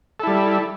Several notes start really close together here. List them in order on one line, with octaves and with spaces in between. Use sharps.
A4 E4 G3